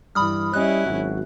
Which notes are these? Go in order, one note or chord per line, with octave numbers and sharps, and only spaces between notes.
G2 E3 B5 D#6 F6
G3 C#4 E4 D#5 F#6
G#1 F#3 F#4